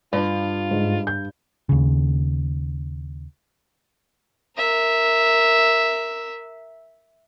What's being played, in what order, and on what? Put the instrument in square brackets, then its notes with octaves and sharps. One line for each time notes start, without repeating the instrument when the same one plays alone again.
[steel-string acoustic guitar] G2 [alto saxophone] F4
[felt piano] G#2
G6
[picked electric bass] D#2 C#3
[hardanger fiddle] A#4 E5